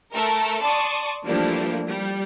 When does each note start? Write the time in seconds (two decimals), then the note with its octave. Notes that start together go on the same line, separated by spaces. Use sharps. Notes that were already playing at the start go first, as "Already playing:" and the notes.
0.12 A3 A4 A#4
0.61 D5 A5 C6 C#6 D#6
1.25 E3 F3 G3 A3 A#3 D4
1.86 G3